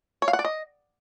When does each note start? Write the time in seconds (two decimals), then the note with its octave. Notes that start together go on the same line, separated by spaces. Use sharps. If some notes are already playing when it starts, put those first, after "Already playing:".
0.22 C#5
0.28 F5
0.33 F#5
0.39 D5
0.45 D#5